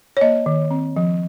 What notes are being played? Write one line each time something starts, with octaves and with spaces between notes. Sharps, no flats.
C#5
A#3 D#5
D#3
C4
F3